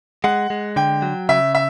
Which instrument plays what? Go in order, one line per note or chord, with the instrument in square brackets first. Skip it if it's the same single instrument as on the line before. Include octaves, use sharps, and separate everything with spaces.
[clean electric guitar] G#3 [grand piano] F#5
[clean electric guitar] G#3
[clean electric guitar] D3 [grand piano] G5
[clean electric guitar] F#3
[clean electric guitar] C#3 [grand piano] E5
[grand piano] E5